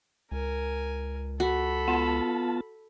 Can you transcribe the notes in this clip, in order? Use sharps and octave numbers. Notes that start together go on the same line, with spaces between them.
C#2 A#4 G#5
F#4 A4 B5
B3 F4 A5